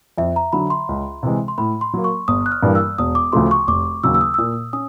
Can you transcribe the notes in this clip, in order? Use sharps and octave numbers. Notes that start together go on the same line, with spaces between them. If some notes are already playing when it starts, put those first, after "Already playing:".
F2 E5
A#5
D3 F#3 B5
C6
C#2
C3 E3 G#3
C6
A2 B5
C6
F#3 A#3
C#6
G1 D#6
F#6
F6
G2 E3 G3 A#3
E6
E1 D#6
D6
D2 C#3 F3 A3 C6
C#6
F1 D6
D#2 C#3 F#3 E6
E6
D#6
E6
A#2 D#6
C#4 D#6